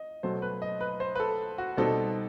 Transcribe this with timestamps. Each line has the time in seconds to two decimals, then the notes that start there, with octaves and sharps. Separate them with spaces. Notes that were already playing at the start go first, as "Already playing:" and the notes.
Already playing: D#5
0.23 B2 F#3 A3 C5
0.42 B4
0.62 D#5
0.81 B4
1.00 C5
1.15 B4
1.20 A4
1.58 F#4
1.77 B2 G3 C4 D#4 A4